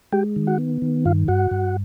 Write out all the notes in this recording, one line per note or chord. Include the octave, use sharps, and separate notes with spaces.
G#3 G4 G5
D#3
F#4 F#5
B3
D#3
G2 F4 F5
G2 F#4 F#5
G2